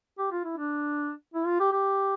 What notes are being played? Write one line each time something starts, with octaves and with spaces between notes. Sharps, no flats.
G4
F4
E4
D4
E4
F4
G4
G4